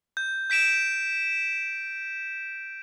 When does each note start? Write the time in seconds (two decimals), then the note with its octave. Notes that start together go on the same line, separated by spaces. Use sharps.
0.17 G6
0.50 G6 B6 D7 E7